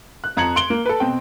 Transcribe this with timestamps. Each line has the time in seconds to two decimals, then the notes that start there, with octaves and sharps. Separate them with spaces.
0.24 F#6
0.37 F2 A#5 G#6 C#7 F#7
0.56 C6 D7 F#7 G7
0.70 A#3
0.86 A4 B4
1.00 B2 C4 G5